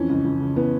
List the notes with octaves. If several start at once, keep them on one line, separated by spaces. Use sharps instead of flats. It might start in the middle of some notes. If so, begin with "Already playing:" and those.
Already playing: F2 E3 C#4
C#2
C#2
C#3
E3 B3